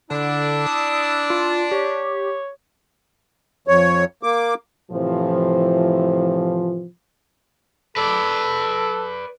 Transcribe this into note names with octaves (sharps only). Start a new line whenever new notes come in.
D3 D4 E4
D#6
F4
G4 C#5
F2 C#5
A#3 D6
A2 C3 E3 F3
A4 B4 D5